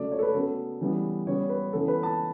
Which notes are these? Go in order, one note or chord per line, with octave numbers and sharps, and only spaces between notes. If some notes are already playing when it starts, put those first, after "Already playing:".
Already playing: C#3 F#3 A3 D5
C#5
A4
B4
C#3 F#3 B3 A4
C#3 E3 G3 B3
C#3 G3 B3 C#5
B4
C#3 E3 B3 A4
B4
A5